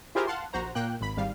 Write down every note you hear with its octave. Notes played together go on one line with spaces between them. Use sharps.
E4 F4 G4 G#4 A#4 C5
F5 F#5 A5 C6
A#1 F#4 C5 A#5
A#2 A#3 G5 F#6
G#1 B5
G#1 G3 F5